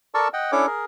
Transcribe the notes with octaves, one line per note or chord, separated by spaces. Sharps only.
A4 A#4 D5 A5 C#6 E6
D#5 F#5 G5
C#4 D4 E4 A4 C#5 D6
G#4 A#4